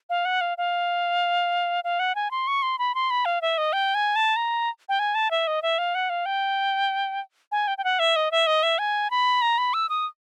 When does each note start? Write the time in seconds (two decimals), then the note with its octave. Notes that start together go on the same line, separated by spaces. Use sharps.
0.10 F5
0.25 F#5
0.41 F5
0.58 F5
1.84 F5
1.99 F#5
2.15 G#5
2.31 C6
2.47 C#6
2.62 C6
2.79 B5
2.95 C6
3.10 B5
3.25 F5
3.42 E5
3.58 D#5
3.73 G5
3.95 G#5
4.16 A5
4.36 A#5
4.89 G5
4.99 G#5
5.15 A5
5.31 E5
5.47 D#5
5.62 E5
5.78 F5
5.95 F#5
6.10 F5
6.26 G5
7.52 G#5
7.68 G5
7.78 G5
7.84 F#5
7.99 E5
8.16 D#5
8.32 E5
8.47 D#5
8.63 E5
8.79 G#5
9.11 B5
9.42 A#5
9.58 B5
9.74 E6
9.89 D#6